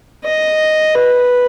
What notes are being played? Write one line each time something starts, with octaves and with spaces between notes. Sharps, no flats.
D#5
B4